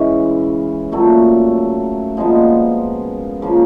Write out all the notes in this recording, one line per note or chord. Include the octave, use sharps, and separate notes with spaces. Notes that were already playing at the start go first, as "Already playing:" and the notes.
Already playing: C#3 E3 G#3 C#4
A#2 F#3 A3
A#2 F3 G#3 B3
C#3 F3 A#3